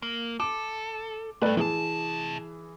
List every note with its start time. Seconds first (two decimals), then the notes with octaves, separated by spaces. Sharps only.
0.02 A#3
0.40 A4 D6
1.42 C2 G2 A3 B4 D5
1.57 C3 E3 G#4 A5